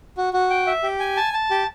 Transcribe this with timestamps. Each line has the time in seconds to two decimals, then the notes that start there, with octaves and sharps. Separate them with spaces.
0.17 F#4
0.33 F#4
0.50 G5
0.67 E5
0.83 G4
1.00 G#5
1.17 A5
1.33 A5
1.51 G4